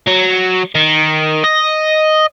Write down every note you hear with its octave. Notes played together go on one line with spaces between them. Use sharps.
F#3
D#3
D#5